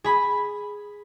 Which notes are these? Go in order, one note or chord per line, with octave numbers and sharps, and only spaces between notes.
G#4 B5